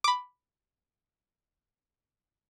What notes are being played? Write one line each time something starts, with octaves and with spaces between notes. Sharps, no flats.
B5 D6